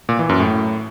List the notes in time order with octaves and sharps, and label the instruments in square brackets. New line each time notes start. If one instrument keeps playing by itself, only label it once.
[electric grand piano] A#2
E3
F#2
A2